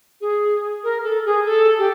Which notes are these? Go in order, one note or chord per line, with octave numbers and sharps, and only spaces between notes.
G#4
A#4
A4
G#4
A4
G4